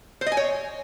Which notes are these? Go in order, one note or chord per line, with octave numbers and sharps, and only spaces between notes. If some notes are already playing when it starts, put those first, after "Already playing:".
C5
D#5
G#5
C#5